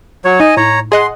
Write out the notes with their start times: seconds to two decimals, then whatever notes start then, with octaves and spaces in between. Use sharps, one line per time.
0.25 F#3 C#5
0.40 D#4 D#5 G#5
0.57 A2 C#5 A#5
0.92 G#4 D#5 F#5 C6